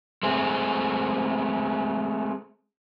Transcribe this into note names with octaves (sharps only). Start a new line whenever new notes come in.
G#3 A3 C4 G#4